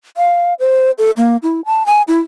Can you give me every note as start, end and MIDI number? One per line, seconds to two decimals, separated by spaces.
0.17 0.54 77
0.60 0.91 72
0.98 1.11 69
1.17 1.37 58
1.43 1.61 64
1.65 1.86 81
1.86 2.02 80
2.08 2.18 64